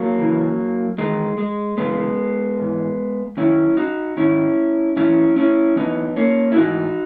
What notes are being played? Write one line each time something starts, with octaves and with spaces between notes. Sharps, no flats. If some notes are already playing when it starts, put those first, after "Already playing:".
Already playing: F#3 A#3
E2 C#3 E3
E2 D#3 G#3
G#3
F#2 C#3 E3 G#3 B3
G#2 E3
F#2 D#3 C#4 E4
D#4 F#4
G#2 D#3 C#4 E4
F#2 E3 C#4 E4
C#4 E4
E2 C#3 E3 B3 D#4
A#3 C#4
E4
G#2 E3 D#4 F#4